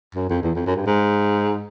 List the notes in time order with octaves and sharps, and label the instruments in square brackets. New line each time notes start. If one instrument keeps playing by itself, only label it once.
[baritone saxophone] F#2
F2
E2
F2
F#2
G2
G#2